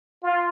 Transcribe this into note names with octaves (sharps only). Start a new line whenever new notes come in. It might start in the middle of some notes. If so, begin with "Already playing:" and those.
F4